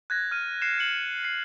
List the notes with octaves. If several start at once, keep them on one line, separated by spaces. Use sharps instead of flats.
F#6 G#6 A#6
F6 D#7
F#6 C7 C#7 E7
A#6 C#7 F#7
C7